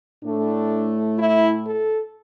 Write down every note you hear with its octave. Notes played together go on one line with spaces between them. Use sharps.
A2 A3 D4
E4
A4